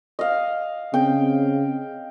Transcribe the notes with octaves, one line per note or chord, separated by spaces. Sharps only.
D#5 F5
C#3 C4 G5